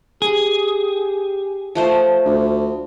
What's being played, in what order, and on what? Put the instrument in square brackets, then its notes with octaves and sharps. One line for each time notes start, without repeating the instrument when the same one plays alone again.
[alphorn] G4 [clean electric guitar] G#4
[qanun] F3 A3 C5
[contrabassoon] D2